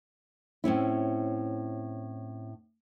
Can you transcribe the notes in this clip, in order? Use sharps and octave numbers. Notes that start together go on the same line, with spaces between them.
A2 C4 C#4 E4